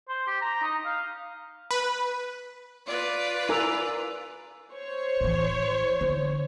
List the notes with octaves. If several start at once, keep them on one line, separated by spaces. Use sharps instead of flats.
C5
G4
A#5
D#4
F5
B4
F4 B4 D5
E4 A#4 G#5 E6 F7
C5 C#5
A2 E3
D3